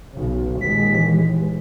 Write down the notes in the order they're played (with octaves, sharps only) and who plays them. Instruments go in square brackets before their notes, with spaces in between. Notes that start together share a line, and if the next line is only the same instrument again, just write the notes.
[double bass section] B1 C#3
[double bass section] D#2 A#2 G#3 [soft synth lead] B6
[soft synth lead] E3